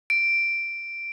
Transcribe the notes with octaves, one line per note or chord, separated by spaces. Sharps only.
D7